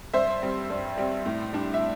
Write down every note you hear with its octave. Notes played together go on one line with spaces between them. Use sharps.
G2 C5 E5
G3 C4
G2
G3 C4
A2
G3 D4
E5